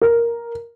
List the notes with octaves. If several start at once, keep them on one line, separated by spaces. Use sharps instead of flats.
A#4